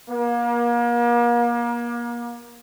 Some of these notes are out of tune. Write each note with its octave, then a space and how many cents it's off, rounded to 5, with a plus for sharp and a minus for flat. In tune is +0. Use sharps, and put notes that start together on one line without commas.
A#3 +35